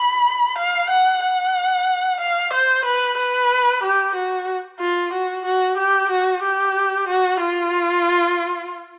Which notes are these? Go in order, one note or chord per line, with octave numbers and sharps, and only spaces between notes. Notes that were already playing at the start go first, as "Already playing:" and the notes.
Already playing: B5
F5
F#5
F#5
F5
C5
B4
B4
G4
F#4
F4
F#4
F#4
G4
F#4
G4
F#4
F4